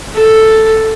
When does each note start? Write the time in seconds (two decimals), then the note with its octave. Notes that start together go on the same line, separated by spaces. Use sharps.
0.14 A4